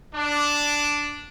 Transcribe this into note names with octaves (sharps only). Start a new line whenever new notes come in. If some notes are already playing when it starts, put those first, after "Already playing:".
D4